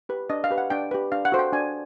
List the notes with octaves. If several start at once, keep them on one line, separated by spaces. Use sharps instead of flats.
G4 B4
D4 D#5
F5
G4 B4
F#5
D4 G5
G4 B4
D4 F5
F#5
F#4 A4 C5
G5
D4 G#5